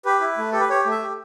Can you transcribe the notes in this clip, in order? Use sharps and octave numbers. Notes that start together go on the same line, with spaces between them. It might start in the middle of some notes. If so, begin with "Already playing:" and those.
G4 B4
E4
A3
G4 A4
B4
G4 C#5
A3
E5
G4